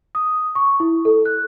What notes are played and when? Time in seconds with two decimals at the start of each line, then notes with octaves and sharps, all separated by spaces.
0.15 D#6
0.55 C#6
0.80 E4
1.05 A4
1.26 F#6